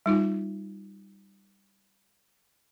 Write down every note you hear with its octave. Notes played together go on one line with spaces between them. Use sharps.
G3 D#4 F4